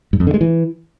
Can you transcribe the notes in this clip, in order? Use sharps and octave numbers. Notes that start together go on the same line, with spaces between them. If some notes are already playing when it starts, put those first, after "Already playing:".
G2
F2
D3
G#3
E3